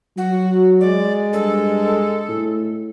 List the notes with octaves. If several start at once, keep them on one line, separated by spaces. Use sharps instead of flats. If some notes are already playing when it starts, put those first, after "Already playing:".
F#3 F#4
G#3 D5
G2 A4
A2